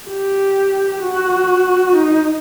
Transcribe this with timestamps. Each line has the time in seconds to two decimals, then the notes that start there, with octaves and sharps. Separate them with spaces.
0.09 G4
1.03 F#4
1.96 D#4